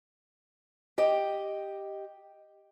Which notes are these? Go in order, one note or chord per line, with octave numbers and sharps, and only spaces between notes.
G4 D#5 G5